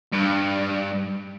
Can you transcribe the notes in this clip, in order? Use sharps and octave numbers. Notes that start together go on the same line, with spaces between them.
G2